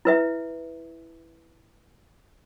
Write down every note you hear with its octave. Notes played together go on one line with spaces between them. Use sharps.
E4 B4 E5